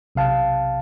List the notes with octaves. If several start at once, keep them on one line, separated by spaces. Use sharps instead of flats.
B1 C3 F5 A5